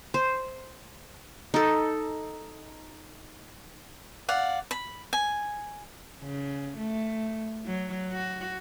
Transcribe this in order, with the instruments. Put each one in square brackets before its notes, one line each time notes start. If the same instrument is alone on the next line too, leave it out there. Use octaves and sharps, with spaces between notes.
[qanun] C5
D#4 A4
[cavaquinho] D5 F5 F#5
B5
G#5
[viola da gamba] C#3
A3
F#3
F#4